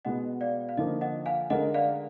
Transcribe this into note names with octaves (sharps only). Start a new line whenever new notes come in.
B2 G#3 B3 D#5 F#5
D5 F5
F5
D3 F3 A#3 D#5
D#5 F#5
F5 G#5
D3 G#3 D#4 A#4 D#5 F#5
D5 F5